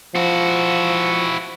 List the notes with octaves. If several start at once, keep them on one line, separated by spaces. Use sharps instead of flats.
F3 E4 F#4